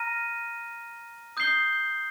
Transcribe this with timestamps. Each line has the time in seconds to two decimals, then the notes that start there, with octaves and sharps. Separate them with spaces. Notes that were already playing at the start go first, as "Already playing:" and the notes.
Already playing: A#5 F6 A#6 D#7
1.37 D#6 G6 C7 G7